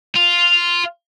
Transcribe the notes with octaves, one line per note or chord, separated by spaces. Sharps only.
F4